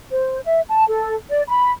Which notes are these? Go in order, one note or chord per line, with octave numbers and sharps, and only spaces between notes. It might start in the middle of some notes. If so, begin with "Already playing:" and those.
C5
E5
A5
A4
D5
B5